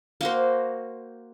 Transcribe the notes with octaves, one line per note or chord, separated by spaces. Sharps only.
A#3 F#4 C5